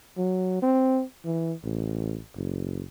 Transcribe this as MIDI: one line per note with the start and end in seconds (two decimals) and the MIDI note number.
0.18 0.58 54
0.63 1.02 60
1.25 1.53 52
1.64 2.19 33
2.36 2.84 30